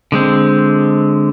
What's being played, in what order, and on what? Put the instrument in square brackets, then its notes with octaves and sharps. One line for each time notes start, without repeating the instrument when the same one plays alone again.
[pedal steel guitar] D3 G#3 C4